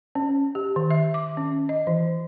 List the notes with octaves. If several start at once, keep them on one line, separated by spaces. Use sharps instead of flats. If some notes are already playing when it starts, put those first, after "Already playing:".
C#4
G4
D#3
E5
D6
C#4
D#5
E3